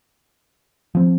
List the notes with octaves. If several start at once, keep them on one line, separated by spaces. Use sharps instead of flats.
F3 C4